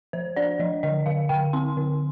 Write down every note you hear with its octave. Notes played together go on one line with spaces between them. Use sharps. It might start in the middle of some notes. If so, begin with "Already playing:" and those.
F3 C5
D4 D5
F3 D#5
D3 D#5
D3 F5
D3 G5
C4 C6
D3